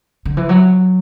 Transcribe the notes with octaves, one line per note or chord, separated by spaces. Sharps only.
D3
E3
F#3